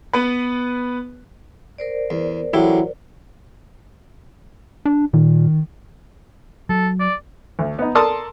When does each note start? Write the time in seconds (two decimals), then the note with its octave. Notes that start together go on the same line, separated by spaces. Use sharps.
0.13 B3 B4
1.78 A#4 C5 D5
2.10 E2
2.53 A1 A2 F#3 E4 G4
4.85 D4
5.13 A#2 D#3
6.69 F#3 A4
7.00 D5
7.59 D2
7.79 B3 D#4
7.95 A4 A#4 D5 A5 C6 D#6